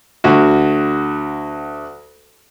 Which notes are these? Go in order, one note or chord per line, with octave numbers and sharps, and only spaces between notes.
D2 F#4